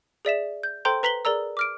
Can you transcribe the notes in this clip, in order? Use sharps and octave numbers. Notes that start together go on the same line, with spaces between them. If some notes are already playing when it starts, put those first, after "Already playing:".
G#4 D5 E5 E7
G6
A4 C5 G5 A#5 C6 G6
B4 A#5 B6 F#7 G7
G#4 A#4 D5 A#5 E6
D6 F6 D7